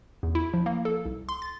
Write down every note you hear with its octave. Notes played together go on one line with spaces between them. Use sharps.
E2
E4
F3
A#3
A4
C2
C6
A6